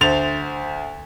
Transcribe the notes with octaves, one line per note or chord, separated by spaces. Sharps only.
D2 C5 A6 F7